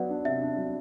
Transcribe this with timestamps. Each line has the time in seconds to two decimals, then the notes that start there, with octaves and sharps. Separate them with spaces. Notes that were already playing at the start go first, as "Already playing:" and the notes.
Already playing: F#3 B3 D5 F#5
0.09 D4
0.25 C3 E5
0.41 D4
0.57 F#3